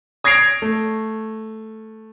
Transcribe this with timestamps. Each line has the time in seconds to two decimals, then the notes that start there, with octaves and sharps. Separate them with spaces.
0.24 D#6 G#6 A#6 C7 D7 F7
0.62 A3